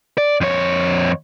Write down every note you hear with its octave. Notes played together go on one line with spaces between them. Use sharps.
D5
F2 C#5